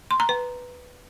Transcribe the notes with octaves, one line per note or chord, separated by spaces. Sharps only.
C6
A#5
B4